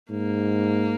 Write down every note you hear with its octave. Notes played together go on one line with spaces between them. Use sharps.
G#2 A#3